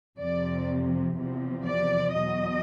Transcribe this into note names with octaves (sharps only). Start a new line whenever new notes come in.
F2 C3 F3 D5
E2 C3 F3
D5
E2 B2 F#3 D#5